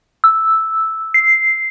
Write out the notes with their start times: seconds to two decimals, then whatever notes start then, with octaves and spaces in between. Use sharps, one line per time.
0.24 E6
1.14 C7